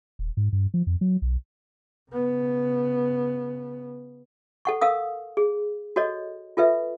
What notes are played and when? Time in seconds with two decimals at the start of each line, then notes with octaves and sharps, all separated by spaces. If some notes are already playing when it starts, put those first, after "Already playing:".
0.19 D#1
0.37 G#2
0.52 G2
0.74 F3
0.87 F2
1.01 F#3
1.22 B1
2.11 C#3 B3
4.65 A4 F#5 C#6
4.81 A4 A#4 F5 D#6
5.37 G#4
5.96 F#4 A4 C#5 D#5
6.57 F4 A4 B4 E5